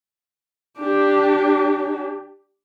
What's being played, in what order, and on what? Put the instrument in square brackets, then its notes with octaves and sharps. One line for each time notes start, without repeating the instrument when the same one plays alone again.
[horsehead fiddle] D4 G4